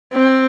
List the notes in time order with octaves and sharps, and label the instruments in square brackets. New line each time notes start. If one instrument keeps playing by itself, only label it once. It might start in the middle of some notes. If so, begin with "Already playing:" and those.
[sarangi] C4